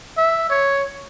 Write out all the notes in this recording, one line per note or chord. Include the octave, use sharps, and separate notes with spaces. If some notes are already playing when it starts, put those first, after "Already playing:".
E5
C#5